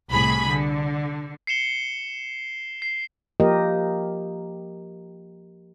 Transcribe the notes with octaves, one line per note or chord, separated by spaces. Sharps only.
C2 A2 G#4 B5
D3
C7 C#7 E7 G7
C7
F3 A#3 G4 A#4 D#5